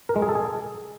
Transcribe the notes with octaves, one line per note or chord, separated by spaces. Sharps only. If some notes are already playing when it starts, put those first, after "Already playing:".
A#4
G#3
G#4
A4
G#4